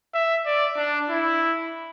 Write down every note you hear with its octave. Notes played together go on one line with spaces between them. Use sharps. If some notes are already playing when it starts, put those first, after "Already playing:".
E5
D5
D4
E4